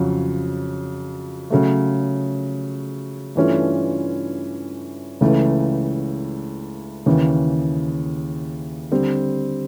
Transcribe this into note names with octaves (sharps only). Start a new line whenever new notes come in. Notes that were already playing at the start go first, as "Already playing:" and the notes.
Already playing: F2 C#3 F#3
C#3 F#3 A3
G2 E3 A3 C#4 F4
C#2 C#3 E3 A3
D#2 C#3 E3
D3 G3 C4